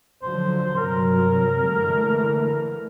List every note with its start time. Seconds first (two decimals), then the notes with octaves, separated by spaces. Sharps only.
0.23 D3 F3 F#3 C5
0.77 G2 C3 F#3 A#4
1.65 D3 E3 A3